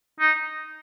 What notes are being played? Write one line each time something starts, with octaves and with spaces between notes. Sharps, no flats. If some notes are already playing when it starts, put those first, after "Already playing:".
D#4